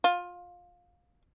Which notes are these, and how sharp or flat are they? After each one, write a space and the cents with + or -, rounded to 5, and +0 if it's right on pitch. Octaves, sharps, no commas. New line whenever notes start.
F4 +20